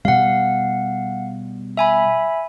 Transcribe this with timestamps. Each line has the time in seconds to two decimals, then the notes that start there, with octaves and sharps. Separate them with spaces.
0.05 B2 G3 F5 F#5
1.77 E5 G#5 B5